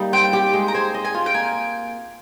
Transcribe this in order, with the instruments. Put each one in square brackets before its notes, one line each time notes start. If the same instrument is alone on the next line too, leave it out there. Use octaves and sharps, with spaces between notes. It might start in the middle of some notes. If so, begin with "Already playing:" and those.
Already playing: [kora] G3 A#3 D#4
[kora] C4 [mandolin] G5
[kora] G4
G#3
[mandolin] A#5
[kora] C5 [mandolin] G#5
[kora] D#5
[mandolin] G#5
[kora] F4
[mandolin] G5
[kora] A#3 [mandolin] G#5